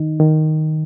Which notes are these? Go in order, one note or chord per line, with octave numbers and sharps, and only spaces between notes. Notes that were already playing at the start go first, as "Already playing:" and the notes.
Already playing: D#3 D#4
D#3